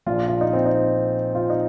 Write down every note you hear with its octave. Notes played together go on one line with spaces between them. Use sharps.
A#1 A#2 F3 F4
F4
D#4
C4
D#4
F4
D#4